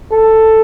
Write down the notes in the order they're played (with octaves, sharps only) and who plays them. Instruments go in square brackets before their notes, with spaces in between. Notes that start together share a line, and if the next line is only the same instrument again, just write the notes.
[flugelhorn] A4